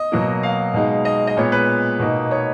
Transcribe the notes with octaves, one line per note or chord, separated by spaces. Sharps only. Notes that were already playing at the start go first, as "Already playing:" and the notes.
Already playing: D#5
B2 F#3 A#3
F5
B2 G#3 D#4
D#5
D#5
A#2 G#3 B3 C#5
B4
B2 A#3 D#4
C#5